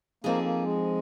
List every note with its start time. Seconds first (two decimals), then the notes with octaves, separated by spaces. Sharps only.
0.24 F2 F3 A#3 C4 D#4 G#4
0.43 A#3
0.63 G#3